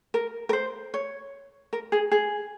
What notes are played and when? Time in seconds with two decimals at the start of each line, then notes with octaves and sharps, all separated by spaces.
0.14 A#4
0.49 A#4
0.53 C5
0.94 C#5
1.73 A#4
1.92 G#4
2.12 G#4